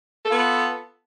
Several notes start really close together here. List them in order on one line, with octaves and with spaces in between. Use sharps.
A4 F4 B3